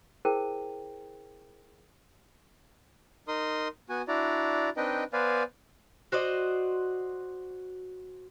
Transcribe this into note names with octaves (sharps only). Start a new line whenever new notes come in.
E4 G#4 A#4 C5 G5 D#7
D#4 A#4 C6 D#6
B3 F#4 G#5
D4 E4 F#4 D5 A#5
C4 D4 D#4 B4 D#5 G5
B3 B4 C5 D5 F5 G#5
F#4 C5 D5 D#5